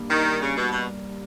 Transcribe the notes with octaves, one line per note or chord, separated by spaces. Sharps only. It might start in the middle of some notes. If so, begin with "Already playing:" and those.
Already playing: G2 G3 A#3
D#3
C#3
B2
B2